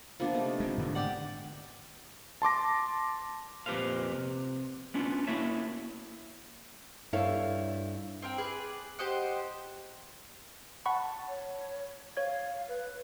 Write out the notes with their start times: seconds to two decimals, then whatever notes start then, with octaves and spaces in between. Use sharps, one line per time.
0.20 F3 A#3 B3 D4
0.34 C3 A3 D#4
0.60 G#3 C4
0.78 G#2 D3 D#3
0.95 G4 D5 F#5
2.42 A5 C6 D6 A#6
3.66 F2 A#2 G4 B4 C5 F5
4.13 C3
4.94 B3 C#4 D4 F4
5.27 A#3 E4 F#4 C#5 E5 A5
7.13 G2 E4 A4 C#5 F5
8.22 C4 A#4 G5
8.38 G#4 B4 D5
8.99 G4 C5 D#5 F#5
10.86 F#5 A5 B5 C#6
11.29 C#5
12.17 C#5 F5 G#6
12.68 B4